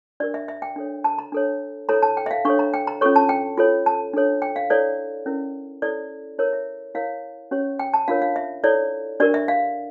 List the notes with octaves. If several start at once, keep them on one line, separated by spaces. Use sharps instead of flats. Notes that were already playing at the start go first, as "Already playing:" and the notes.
D4 G4 A#4 D5
E5
E5
G5
D4 A4 C#5
A5
A#5
D4 A4 C#5
E4 A4 C#5 A#5
A5
G5
E5
F5
D4 A4 C#5 C#6
A#5
G5
A#5
C#4 F4 A4 C#5 C#6
A5
G5
F4 A4 C#5
A5
D4 A4 C#5
G5
F5
E4 A4 C#5 D5
C#4 E4 A#4
E4 A4 C#5 D5
E4 A#4 C#5
E5
E4 A#4 C#5 F5
C#4 G4 C#5
G5
A5
D4 F4 A#4 C#5 F5
F5
E5
E4 A4 C#5 D5
D4 G4 A#4 D5
E5
F5